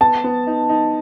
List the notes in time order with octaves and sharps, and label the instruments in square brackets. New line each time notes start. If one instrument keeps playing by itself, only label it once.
[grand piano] B3 [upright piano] A5
[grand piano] B3
D#4
D#4